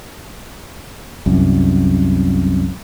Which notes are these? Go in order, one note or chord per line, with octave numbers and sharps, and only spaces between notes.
C2 F#2